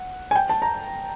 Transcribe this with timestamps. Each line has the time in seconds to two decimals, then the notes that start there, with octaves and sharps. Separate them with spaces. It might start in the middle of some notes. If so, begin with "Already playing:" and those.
Already playing: F#5
0.31 G#5
0.36 G5
0.50 A5
0.62 A#5